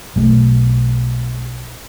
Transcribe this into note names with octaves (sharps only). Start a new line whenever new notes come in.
B1 A3